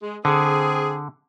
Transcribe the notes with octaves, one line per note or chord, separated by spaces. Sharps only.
G#3
D3 C4 G#4